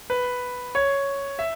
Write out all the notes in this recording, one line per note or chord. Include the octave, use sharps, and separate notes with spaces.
B4
C#5
E5